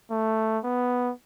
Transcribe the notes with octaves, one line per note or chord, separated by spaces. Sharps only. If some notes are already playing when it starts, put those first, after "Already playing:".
A3
B3